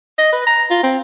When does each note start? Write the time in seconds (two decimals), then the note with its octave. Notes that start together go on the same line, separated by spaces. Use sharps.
0.18 D#5
0.33 B4
0.47 A#5
0.71 F4
0.84 C4